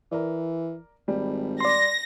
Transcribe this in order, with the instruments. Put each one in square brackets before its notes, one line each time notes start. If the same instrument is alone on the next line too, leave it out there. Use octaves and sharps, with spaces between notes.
[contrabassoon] E3 [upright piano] A#4 D5
[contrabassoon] G#1 [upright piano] G3
[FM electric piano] D5 C6 [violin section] A#6